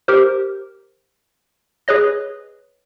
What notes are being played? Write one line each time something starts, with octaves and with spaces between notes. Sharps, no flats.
G4 A#4 C5
G#4 B4 C#5 D#5